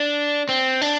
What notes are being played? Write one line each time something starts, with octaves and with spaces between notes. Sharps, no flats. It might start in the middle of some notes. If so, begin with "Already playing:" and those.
Already playing: D4
C4
D4